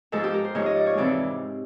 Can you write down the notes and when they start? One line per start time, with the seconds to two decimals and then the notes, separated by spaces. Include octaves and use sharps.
0.12 G#2 F3 G#3 A4
0.24 G4
0.34 A#4
0.44 C5
0.55 G#2 F3 G#3 C#5
0.66 D#5
0.76 D5
0.86 C#5
0.97 F2 C3 E3 G#3 D5